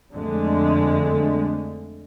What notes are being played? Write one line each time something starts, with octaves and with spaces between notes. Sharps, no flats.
F2 D3 G#3 A3